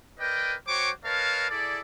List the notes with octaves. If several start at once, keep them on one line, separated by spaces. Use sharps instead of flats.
A#4 B4 D5 D#5 G5
F#4 C5 C#5 G5 C#6 D6
A#4 B4 C#5 D#5 F5 A5
E4 G#4 A4 D5